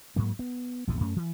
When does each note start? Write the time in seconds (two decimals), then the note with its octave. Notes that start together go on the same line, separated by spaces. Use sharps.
0.16 G#2 F#3 A#3
0.39 B3
0.87 A#1 E2 G#2 C3
1.00 F#2 A3 C#4
1.16 E3